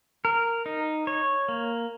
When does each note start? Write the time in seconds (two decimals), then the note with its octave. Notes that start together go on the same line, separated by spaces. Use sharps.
0.25 A#4
0.66 D#4
1.07 C#5
1.49 A#3